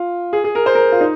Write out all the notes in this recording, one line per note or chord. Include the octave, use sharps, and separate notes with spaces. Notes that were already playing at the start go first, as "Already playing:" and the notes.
Already playing: F4
G#4
G#4
A#4
C5
A#4
F4
D#4